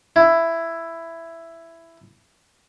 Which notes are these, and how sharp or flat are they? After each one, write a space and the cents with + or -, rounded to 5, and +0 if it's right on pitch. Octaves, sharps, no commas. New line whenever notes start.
E4 +10